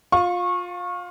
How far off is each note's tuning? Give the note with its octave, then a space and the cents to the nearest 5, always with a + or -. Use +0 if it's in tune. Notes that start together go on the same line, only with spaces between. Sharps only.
F4 +20 C#6 -20